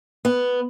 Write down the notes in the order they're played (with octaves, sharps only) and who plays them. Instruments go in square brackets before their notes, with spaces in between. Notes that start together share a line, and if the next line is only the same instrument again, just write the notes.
[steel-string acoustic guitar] B3